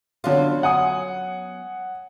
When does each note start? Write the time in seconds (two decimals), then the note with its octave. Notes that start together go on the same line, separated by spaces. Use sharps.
0.24 D3 F#3 B3 C#4 F4
0.63 F#5 G#5 D#6